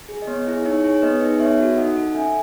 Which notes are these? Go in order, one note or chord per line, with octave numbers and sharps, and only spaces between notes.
G#4
D#5
B3 C#5
E4 G#4
D#4 C#5
G#4 C#5
B3 B4 D#5
D#4 G#4
B3 C#5 E5
F#4 A4
D#4 D#5 F#5
A4
C#4 E5 G#5